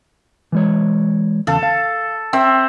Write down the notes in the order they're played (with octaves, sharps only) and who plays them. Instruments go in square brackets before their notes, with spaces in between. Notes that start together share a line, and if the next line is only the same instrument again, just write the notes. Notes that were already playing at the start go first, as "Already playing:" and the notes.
[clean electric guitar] E3 G#3 C#5
[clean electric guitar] E2 C#3 F5 [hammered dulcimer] A4
[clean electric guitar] F5
[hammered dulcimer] C4 E5 [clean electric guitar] G5